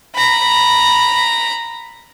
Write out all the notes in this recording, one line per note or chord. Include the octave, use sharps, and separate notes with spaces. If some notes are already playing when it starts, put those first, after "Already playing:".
A#5 B5